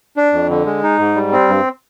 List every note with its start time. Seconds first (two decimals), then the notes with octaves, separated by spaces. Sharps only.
0.17 D4
0.33 F2
0.50 D3
0.66 G#3
0.83 D#4
0.99 G#2
1.15 G3
1.33 C4
1.48 G2